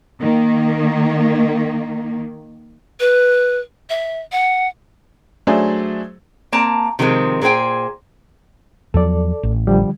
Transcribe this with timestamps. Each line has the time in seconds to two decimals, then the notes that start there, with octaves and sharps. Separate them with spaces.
0.20 D#3 A#3
3.00 B4
3.90 E5
4.32 F#5
5.47 F#3 A3 D4 G#4 C5
6.52 A#3 C4 A5 A#5
6.99 C3 D#3 F3 G#3 C4
7.41 A#2 G#4 C5 G5 G#5
8.94 E2 F3 F#3 A4 D5
9.43 A1
9.67 D3 F3 G3